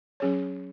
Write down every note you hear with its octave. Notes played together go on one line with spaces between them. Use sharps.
F#3 C#4 G#4 C#5